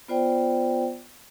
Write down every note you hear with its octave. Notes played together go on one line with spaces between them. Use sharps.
B3 F4 C5 D5 G5